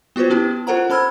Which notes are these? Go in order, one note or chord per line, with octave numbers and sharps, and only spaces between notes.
B3 F4 F#4 B4 C5
B3 C#4 E4 G4
F4 A4 A#4 C5 F#5 A#5
C#4 C5 B5 E6 F6 G#6